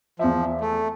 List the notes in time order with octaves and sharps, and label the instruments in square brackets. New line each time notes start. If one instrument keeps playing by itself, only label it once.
[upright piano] E2 E5 [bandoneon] F3
[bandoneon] A3